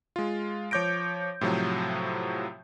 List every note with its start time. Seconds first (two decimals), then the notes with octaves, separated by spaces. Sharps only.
0.16 G#3 F4
0.71 F3 C#5 D6 G6 A#6 D7
1.41 A2 C3 F3 F#3